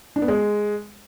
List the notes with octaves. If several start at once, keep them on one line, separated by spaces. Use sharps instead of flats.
D4
B3
G#3